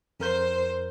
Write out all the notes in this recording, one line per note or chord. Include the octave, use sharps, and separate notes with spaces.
F2 A#4 C5 G6